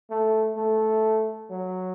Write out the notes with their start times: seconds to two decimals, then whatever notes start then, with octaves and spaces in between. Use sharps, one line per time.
0.10 A3
0.57 A3
1.51 F#3